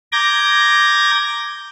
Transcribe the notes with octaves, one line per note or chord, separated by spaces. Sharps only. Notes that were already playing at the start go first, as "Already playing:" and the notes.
A#5 D6 G6 G#6 A#6